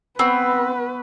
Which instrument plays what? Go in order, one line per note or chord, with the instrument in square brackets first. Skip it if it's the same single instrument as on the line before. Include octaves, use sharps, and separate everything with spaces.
[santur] B3 C#6 E6 [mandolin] C4 [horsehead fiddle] B4